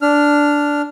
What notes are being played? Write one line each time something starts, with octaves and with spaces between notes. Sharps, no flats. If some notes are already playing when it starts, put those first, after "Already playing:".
D4 F6